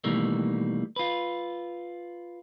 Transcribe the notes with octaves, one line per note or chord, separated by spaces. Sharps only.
B2 D#3 E3 G3 A3 A#3
F4 B4